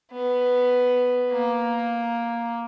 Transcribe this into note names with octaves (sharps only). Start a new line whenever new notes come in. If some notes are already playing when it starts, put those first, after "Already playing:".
B3
A#3